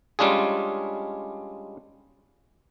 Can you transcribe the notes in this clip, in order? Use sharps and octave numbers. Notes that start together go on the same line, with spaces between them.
G3 G#3 C#4 D4 F4 G#4